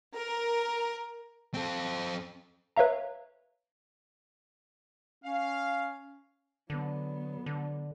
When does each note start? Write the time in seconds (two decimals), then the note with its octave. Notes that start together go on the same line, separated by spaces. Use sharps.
0.14 A#4
1.54 C4 A4
2.77 B4 C#5 E5 F5 A#5
5.24 C#4 F5
6.70 D3 F#3 B3
7.46 D3